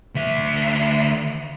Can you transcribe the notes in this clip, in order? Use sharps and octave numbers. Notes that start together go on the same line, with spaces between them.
D2 E5